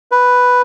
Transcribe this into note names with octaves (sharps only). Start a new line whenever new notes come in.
B4